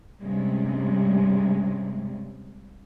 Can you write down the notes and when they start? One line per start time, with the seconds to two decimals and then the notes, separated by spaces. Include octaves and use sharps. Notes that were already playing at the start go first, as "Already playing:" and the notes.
0.20 G2 C3 G3 G#3 C#4